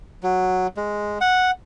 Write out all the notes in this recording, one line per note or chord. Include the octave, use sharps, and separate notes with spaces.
F#3
G#3
F#5